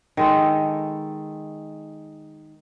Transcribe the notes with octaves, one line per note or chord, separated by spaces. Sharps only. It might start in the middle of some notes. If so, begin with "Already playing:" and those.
D#3 G#3 A4